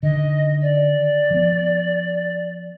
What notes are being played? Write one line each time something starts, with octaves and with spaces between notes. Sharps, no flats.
D3 D#3 D#5
D5
F3 B3